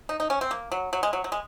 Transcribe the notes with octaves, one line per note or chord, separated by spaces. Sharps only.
D#4
D#4
C#4
C4
A#3
F#3
F#3
G#3
F#3
F#3
G#3